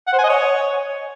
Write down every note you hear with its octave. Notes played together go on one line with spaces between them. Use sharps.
F#5
C5
G#5
D#5
C#5